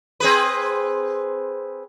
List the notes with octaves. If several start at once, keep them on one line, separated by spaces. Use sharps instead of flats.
C4 G#4 B4